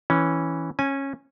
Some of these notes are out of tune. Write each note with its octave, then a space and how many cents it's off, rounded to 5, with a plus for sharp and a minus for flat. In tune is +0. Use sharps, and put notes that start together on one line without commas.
E3 +0 C#4 +0
C#4 -15 G#5 +0